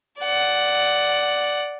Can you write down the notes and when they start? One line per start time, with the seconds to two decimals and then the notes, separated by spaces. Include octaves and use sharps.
0.20 D5 F#5